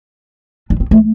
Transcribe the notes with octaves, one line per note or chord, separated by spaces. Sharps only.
D4
C4
A3